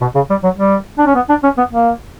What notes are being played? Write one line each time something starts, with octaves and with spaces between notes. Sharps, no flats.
B2
C#3
G3
F#3
G3
D4
C#4
B3
D4
C#4
B3
A#3